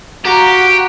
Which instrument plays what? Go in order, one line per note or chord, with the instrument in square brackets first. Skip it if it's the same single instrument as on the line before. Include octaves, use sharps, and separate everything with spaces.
[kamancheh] F#4 [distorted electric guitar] G4 [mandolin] A#4 F5 A#5